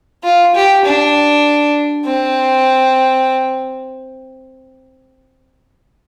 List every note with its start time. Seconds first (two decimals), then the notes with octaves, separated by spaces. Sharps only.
0.24 F4
0.55 G4
0.85 D4
2.06 C4